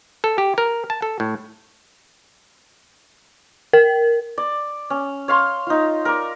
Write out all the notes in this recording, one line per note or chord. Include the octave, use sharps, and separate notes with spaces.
A4
G4
A#4
A5
A4
A2
A#4
D5
C#4
C#5 F5 C6
D#4 F4
A#4 D5